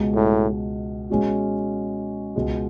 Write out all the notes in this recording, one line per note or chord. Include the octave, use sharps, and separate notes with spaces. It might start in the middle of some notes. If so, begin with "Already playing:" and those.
Already playing: C#2 B2 G#3
A2
B2 G#3 C#4 F#4
C#2 B2 G#3